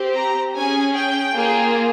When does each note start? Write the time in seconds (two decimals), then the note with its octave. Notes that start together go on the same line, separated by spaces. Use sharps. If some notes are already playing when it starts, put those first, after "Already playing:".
Already playing: C4 G4
0.14 A#5
0.54 C#4 G#4 G#5
0.95 G5
1.35 A#3 F4 G#4